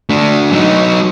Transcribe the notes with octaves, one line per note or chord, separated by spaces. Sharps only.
A3 D4
F#3 D#4